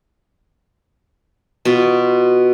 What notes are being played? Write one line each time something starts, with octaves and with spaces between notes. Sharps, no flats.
B2 F4